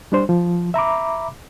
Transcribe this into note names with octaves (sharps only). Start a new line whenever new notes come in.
G3 D4 C5
F3
E5 A#5 B5 D6